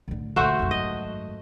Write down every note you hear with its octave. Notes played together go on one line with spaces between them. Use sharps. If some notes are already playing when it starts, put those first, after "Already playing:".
A2 D3
D2 A#2 A3 F#4 C5
G#1 F#2
D#5